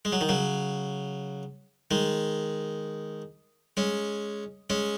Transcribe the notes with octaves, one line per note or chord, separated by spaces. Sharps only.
G#3
F#3
D#3
C#3 F#3
D#3 G#3
G#3 C#4
G#3 C#4